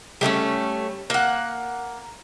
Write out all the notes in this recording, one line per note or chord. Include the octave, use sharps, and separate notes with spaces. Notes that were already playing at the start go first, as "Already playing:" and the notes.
G3 A3 B3 C#4
A#3 F#5